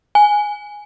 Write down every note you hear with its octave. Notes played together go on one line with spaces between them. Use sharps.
G#5